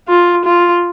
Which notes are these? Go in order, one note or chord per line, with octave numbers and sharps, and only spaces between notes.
F4
F4